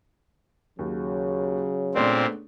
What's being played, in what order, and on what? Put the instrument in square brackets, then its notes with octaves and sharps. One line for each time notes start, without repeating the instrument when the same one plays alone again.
[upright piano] D#2 [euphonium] C#3 [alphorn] F#3
[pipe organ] A#2 C4 [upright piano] A3 B3 D4